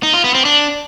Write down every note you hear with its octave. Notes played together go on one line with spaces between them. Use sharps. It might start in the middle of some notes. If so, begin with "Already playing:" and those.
D#4
F4
B3
C4
D4